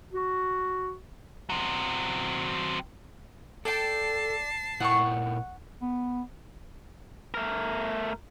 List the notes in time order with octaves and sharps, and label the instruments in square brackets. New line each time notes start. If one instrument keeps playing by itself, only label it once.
[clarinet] F#4
[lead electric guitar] F#3 C4
[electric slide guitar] A4 [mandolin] D5 G5 [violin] A5 C7
[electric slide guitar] A#2 E4 G5 [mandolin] F#5 C#6
[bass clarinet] B3
[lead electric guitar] A3 A#4